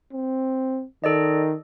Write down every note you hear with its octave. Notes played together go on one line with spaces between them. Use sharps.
C4
D#3 A4 D5 D#5